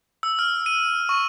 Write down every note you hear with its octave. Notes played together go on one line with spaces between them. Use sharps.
E6
F6
D#7
C#6